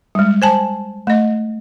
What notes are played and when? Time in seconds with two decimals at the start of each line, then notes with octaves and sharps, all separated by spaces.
0.15 G3 G#3
0.42 C5 G#5 A5
1.07 A3 D#5